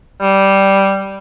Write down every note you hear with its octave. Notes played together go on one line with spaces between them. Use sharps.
G3